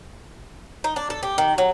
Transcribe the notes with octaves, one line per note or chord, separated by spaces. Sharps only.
D#4
D4
A4
G4
D#3
F#3